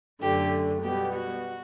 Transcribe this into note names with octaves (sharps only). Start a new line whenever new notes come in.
F#2 D3 A3 G4
B2 G3 B3 G4
F#4